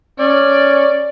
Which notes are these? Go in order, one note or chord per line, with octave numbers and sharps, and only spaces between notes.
C#4 D5